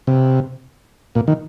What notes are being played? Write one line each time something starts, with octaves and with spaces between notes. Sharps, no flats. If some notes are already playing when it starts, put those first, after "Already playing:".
C3
A#2
D#3